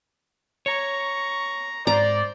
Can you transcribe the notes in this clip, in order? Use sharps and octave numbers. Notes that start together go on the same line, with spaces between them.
C#5 A#5 C#6
G#2 C5 D5 A#5